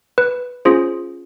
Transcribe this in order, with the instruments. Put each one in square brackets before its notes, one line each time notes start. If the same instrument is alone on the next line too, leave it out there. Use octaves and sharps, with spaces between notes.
[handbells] B4
C#4 F4 G#4 C5